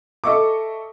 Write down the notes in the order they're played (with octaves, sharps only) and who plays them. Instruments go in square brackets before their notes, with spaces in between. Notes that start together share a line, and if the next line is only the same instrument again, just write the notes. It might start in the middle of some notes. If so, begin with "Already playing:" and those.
[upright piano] A4 D#5 E5 C#6 D6